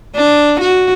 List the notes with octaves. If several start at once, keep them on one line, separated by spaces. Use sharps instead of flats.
D4
F#4